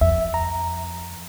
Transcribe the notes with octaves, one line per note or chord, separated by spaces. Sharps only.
F2 E5
A#5